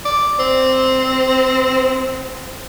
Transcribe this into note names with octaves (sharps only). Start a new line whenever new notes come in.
D5
C4